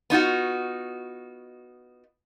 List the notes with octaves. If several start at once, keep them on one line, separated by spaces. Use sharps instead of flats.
B3 D#4 F4 F#4